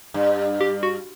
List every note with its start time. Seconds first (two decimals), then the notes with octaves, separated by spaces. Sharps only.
0.14 G2
0.61 G4
0.83 F#4